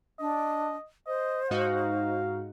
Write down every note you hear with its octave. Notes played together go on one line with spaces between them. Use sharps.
D4 D#5
C5 D#5
G#2 D#4 F#4 F5